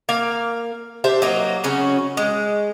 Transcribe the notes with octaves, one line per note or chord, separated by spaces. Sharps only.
A#3 F5
D4 G4 C5 E5
F#3 A#3 D#4
C#3 F#3 C#4 F#4
G#3